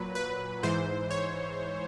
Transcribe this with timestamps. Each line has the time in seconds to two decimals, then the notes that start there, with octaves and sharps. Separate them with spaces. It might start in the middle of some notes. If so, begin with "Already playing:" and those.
Already playing: A#2 F#3 B4
0.15 B4
0.63 G#2 E3 C5
1.11 C#5